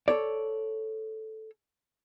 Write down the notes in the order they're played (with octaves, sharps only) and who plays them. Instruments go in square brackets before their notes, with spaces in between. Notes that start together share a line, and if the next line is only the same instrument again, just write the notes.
[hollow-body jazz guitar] A4 C#5 D5